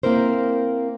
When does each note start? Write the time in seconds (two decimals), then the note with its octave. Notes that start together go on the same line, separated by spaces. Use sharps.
0.03 A#3 C4 E4 A#4 C5